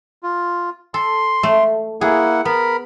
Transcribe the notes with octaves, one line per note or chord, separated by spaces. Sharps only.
F4
A4 C6
A3
A#3 E4 G#4 F#5
B3 A#4 B5